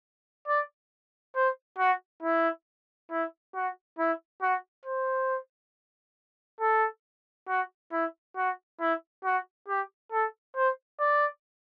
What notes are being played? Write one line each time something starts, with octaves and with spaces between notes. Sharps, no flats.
D5
C5
F#4
E4
E4
F#4
E4
F#4
C5
A4
F#4
E4
F#4
E4
F#4
G4
A4
C5
D5